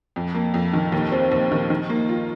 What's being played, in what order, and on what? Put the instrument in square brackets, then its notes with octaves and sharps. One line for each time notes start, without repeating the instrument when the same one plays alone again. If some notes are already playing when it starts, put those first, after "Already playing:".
[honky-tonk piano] F2
A#3
F2
D#3
D#2
C4
D#2
D#3
D#3
A#3
F4